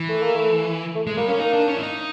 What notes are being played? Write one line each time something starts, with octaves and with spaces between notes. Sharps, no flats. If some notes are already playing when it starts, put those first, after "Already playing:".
Already playing: E3
A3
A#3
A3
A3
G#3
G3 A#3
A#3 C#4
A#3 D#4
D4
C#4
E4
D#4